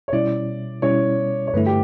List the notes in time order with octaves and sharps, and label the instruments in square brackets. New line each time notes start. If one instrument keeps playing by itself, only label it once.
[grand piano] C#5
[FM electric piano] B2 G3 C#4 E4 [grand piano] D5
[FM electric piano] B2 G3 C#4 E4 [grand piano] C#5
[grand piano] C#5
[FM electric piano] G2 D3 A3 E4 [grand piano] B4
[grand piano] G4